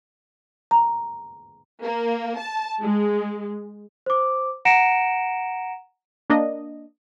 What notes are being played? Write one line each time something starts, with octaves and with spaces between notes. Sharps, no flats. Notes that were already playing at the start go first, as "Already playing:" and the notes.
A#5
A#3
A5
G#3
C5 D6
F#5 A#5 A#6 C#7 D7 E7
A#3 D4 D#5